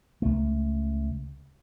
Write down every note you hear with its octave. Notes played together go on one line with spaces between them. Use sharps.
C#2 A3